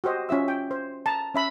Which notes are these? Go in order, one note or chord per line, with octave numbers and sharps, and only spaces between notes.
F#4 G4 C5 D#5
C#4 F4 E5 E6
G5
C5
A5 A#5
C#4 E5 B5